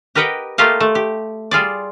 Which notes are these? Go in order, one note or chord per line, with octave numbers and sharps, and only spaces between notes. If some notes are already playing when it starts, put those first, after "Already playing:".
G4 A#4 B4 D#5 F#5 G5
A3 A#3 F4 G4 D#5 F5
A3
G4
G3 F4 G#4 D5